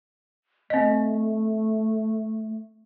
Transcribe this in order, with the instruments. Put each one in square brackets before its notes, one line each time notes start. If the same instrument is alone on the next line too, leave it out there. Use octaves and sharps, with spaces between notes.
[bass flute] A3 [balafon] C4 D#5